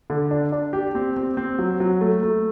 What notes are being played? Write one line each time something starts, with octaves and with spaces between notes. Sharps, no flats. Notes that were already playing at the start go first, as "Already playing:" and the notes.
D3
D4
D4
G4
C4
C4
C4
F#3
F#3
A3
A3